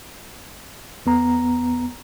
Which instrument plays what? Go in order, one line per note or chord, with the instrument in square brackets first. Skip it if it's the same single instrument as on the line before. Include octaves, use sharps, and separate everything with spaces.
[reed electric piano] E2 B3 A#5